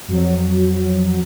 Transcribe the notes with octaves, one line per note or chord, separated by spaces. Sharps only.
F2 F#3